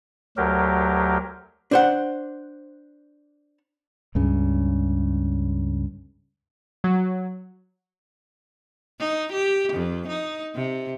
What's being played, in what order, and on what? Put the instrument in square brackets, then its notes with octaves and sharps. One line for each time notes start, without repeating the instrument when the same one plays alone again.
[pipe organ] D2 F#3 G4 A#4
[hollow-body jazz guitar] D4 C5 F#5
[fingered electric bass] C#2 G2 C#3
[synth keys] F#3
[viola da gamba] D#4
G4
F2
D#4
C3